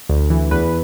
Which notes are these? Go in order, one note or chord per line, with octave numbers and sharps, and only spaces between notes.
D2
E3
E2 B4